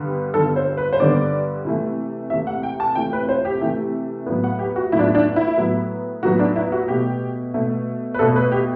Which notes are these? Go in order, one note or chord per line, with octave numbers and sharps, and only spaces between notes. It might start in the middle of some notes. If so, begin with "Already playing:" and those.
Already playing: G2 D3 G3 B3
G2 D3 G3 B3 A4
C5
B4
C5
G2 D3 G3 B3 D5
C3 E3 A3
C3 E3 A3 E5
F#5
G5
A5
C3 E3 A3 G5
B4
C5
G4
C3 E3 A3
A2 F#3 B3
F#5
G4
F#4
A2 F#3 B3 E4
D4
E4
D4
E4
A2 F#3 B3
A2 F#3 B3 F#4
D4
E4
F#4
B2 A3 G4
B2 A3
B4
B2 A3 A4
B4
G4